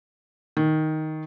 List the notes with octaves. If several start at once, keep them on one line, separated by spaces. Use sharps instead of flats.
D#3